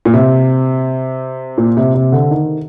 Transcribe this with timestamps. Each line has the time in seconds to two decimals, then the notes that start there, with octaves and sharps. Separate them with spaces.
0.05 A#2
0.13 C3
1.58 A#2
1.77 C3
1.94 C3
2.12 D3
2.31 D#3